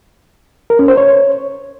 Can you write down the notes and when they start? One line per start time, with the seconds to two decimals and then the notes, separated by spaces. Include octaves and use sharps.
0.70 A#4
0.79 C#4
0.88 C5
0.97 C#5